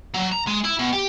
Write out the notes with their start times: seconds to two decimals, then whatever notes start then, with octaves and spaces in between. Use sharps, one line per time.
0.14 F#3
0.32 A#5
0.47 G#3
0.64 E4
0.79 B2
0.93 G4